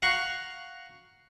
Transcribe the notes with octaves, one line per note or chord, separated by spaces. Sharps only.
F5 F#5 A#5 C#6